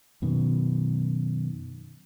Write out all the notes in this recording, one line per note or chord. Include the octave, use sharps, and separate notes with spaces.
F#2 B2 D#3